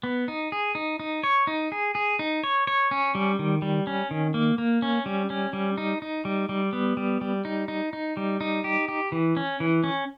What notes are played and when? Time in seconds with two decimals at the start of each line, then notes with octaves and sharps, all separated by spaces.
0.03 B3
0.28 D#4
0.52 G#4
0.75 D#4
1.00 D#4
1.23 C#5
1.47 D#4
1.72 G#4
1.95 G#4
2.19 D#4
2.44 C#5
2.67 C#5
2.91 C#4
3.15 G3
3.39 D#3
3.62 G3
3.87 C#4
4.11 D#3
4.34 A#3
4.58 A#3
4.82 C#4
5.06 G3
5.30 C#4
5.53 G3
5.78 D#4
6.02 D#4
6.25 G3
6.49 G3
6.73 B3
6.97 G3
7.21 G3
7.45 D#4
7.68 D#4
7.93 D#4
8.17 G3
8.41 D#4
8.64 G4
8.88 G4
9.12 E3
9.37 C#4
9.60 E3
9.84 C#4